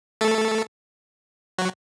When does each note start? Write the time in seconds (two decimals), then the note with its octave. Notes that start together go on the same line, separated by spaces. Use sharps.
0.21 A3 A4
1.58 F#3 F#4